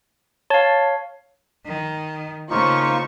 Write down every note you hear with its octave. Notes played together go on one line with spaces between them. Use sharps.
C#5 F5 A5
D#3
C#3 A3 A#3 D#4 F4 C5 C#6